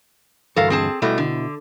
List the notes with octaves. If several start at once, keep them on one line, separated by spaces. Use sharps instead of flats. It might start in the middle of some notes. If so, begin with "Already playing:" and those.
D2 G2 E3 A4 A#4 F5
C4 G#4 A5
B2 G3 A3 E4 D#5
D3